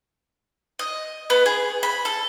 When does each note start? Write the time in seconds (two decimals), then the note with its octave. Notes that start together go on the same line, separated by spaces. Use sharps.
0.79 D#5
1.30 B3
1.46 G#4
1.83 B5
2.05 A4